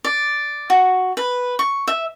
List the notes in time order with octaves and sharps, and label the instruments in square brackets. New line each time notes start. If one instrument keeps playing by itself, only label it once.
[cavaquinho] D5
F#4
B4
C#6
E5